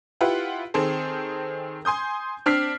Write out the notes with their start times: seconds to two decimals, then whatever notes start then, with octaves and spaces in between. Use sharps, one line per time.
0.21 E4 F4 G4 B4 F#5
0.74 D#3 C4 G#4 A4 C5
1.85 G#5 C6 D#6 G6
2.46 C4 D4 F6 B6 C7